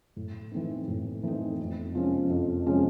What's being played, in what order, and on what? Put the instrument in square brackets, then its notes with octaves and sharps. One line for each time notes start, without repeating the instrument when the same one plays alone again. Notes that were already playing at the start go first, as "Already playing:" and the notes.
[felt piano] A2
E3 A3 C4 D#4
A2
E3 A3 C4 D#4
F2
C3 F3 G#3 C#4
F2
C3 F3 G#3 C#4